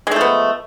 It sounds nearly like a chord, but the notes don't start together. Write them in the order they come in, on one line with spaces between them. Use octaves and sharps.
G#3 A3 F3 B3